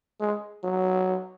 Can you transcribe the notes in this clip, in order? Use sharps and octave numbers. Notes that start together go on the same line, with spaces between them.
G#3
F#3